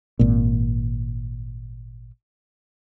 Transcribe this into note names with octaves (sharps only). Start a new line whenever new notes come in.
G#1 A#2